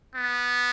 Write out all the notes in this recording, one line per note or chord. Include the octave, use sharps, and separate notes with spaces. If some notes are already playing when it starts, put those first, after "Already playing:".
B3